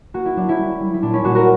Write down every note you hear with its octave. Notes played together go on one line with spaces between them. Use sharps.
A#3 F#4
E4
F#3 D4
C#4 E4
G3
G3
E4
A#2 D4
C#4 E4
A#2 D4 F#4
F#4 A#4